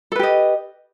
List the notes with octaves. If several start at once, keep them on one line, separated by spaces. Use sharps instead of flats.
G4 A4 B4 D#5